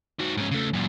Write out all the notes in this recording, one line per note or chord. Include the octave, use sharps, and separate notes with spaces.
D#3 F#4
G#2 C#4
C#3 A3
F#2 A#2